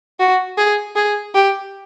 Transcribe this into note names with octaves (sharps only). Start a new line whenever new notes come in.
F#4
G#4
G#4
G4